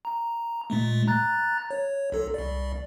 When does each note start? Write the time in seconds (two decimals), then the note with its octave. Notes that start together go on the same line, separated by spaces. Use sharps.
0.05 A#5
0.70 A#2 G#3 A3
1.08 A#5 F#6 A6
1.71 C#5
2.12 B1 A4
2.34 C2 D5